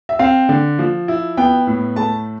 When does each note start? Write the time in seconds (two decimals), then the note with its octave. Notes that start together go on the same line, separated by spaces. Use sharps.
0.09 E5
0.19 C4 F5
0.49 D3
0.79 F3
1.08 E4
1.37 B3 G5
1.67 A2
1.96 A3 A5